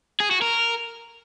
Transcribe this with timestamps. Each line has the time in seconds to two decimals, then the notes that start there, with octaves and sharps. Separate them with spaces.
0.20 G#4
0.31 F#4
0.42 A#4